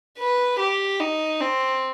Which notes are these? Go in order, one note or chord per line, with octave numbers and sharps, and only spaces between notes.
B4
G4
D#4
C4